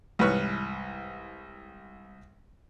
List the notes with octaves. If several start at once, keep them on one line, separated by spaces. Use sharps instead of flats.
C2 G#2 E3 B4 C#5 F6